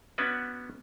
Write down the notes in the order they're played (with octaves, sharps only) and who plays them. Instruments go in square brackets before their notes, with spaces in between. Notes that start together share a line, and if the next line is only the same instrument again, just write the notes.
[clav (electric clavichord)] B3 C#4 D4 F#4 B4